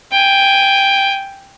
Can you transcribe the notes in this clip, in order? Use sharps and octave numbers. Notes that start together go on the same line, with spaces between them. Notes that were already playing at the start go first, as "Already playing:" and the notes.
G5 G#5